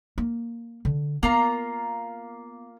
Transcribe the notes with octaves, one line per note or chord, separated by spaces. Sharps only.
A#3
D3
A#3 B3 F4 A#5